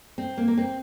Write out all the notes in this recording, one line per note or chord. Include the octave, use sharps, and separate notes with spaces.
C4
A#3
A#3
C4